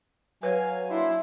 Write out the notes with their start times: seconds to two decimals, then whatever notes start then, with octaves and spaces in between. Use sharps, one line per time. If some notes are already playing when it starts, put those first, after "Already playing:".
0.43 F#3 B4 C#5 F5 G#5
0.90 A#3 D4 E4 C6